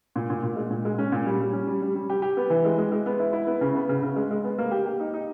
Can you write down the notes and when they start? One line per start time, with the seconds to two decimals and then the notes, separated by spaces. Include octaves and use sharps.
0.16 A#2
0.30 A#2
0.43 A#2
0.56 G#3
0.70 A#2
0.85 G#3
0.98 C#4
1.12 A#2
1.26 G3
1.40 G3
1.53 C#4
1.67 G3
1.82 G3
1.95 G3
2.10 G4
2.22 G4
2.37 B3
2.50 E3
2.65 G#3
2.78 G#3
2.92 G#3
3.06 B3
3.19 E4
3.33 E4
3.47 B3
3.61 C#3
3.75 B3
3.89 C#3
4.03 C#3
4.16 G#3
4.31 G#3
4.44 B3
4.58 A#3
4.71 G4
4.86 G4
5.00 D#4
5.14 D#4